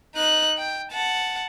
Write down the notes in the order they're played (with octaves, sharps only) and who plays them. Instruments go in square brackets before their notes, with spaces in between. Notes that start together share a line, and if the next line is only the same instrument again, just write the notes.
[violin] D#4 F#6
G5
F#5 A5